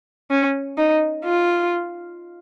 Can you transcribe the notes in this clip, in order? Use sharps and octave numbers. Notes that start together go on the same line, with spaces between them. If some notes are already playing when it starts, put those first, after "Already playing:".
C#4
D#4
F4